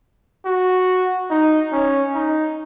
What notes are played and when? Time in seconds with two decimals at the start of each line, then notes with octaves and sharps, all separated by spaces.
0.46 F#4
1.31 D#4
1.72 C#4
2.15 D#4